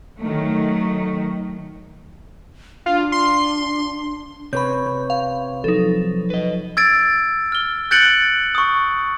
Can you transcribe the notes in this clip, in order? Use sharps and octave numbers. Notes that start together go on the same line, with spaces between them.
D#3 F#3 A3
D4 F4
C6
C3 B4 C#5 B5 G6
B4
F5
F3 F#3 D#4 A4
B4 D#5
E6 G#6 A6 D7
F6 G7
F#6 G6 A6 C#7 D7 F#7
C#6 D#6